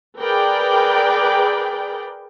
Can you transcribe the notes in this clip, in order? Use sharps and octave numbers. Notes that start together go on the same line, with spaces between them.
G#4 A#4 B4 D5 G5